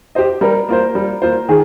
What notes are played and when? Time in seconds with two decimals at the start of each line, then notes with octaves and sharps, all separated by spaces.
0.15 G4 C5 D#5
0.41 G3 A#4
0.69 A#3 F4 C5
0.95 G3
1.22 A#3 F4 C5
1.49 D#3 G#4